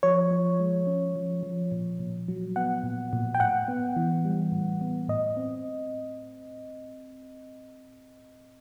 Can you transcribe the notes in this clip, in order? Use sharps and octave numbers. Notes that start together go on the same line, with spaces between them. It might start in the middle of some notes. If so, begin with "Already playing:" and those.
F3 C#5
F3
G#3
C#4
F3
F3
A#2
A#2
F#3
B3 F#5
A#2
A#2
G5
A2 F#5
B3
E3
G3
A2
B3
A2 D#5
C4